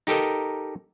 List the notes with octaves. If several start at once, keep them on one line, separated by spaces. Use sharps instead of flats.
D#4 G4 A4 A#4 D#5